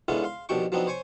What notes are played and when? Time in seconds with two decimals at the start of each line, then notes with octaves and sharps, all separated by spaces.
0.08 G#2 D3 B3 C#4 E4 F4
0.24 F5 C6
0.49 D#2 B2 F3 D4 G5 C#6
0.72 F3 F#3 B3 C4 D4 D#4
0.87 C5 C#5 G#5 C#6